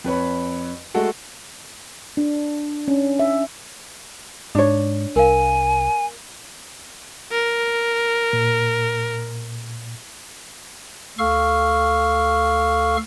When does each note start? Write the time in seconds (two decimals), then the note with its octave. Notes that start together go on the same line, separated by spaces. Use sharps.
0.04 F2 B4 C#5 B5
0.94 G#3 A3 F#4 A4
2.17 D4
2.88 C#4
3.19 E5
4.55 G#2 D4 C#5
5.16 C2 A#4 F5 G#5
7.31 A#4
8.33 A#2
11.18 D2 A4 F5 C#6 F6